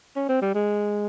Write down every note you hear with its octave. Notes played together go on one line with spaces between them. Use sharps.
C#4
C4
G3
G#3